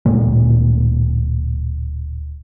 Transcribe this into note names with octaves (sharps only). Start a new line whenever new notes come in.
D1 A#2 G#3 A#3